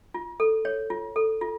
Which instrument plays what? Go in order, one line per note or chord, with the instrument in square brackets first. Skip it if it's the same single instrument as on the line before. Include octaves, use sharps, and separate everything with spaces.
[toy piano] F4
A4
C#5
F4
A4
F4